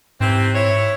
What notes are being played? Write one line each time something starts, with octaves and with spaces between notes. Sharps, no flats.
G#2 C3 E3 C4
E4 C#5